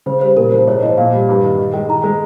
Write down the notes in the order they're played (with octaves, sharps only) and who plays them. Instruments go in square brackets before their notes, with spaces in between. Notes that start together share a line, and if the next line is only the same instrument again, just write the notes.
[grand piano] C#3 [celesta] C5
[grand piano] G3 [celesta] C5
[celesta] C5
[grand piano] A#2 [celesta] A#4
[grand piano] F3 [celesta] C5
[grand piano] G#2 [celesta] C#5
[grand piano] F3 [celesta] D#5
[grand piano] A#2 [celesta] F5
[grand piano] G3
G2
D#3
D#3
[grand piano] G#3 [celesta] G5
[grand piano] D#3 [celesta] A#5
[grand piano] G#3